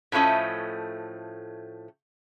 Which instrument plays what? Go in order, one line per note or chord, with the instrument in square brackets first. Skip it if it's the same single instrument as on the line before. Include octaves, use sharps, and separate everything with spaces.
[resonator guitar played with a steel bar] A2 F3 A3 C#4 D#5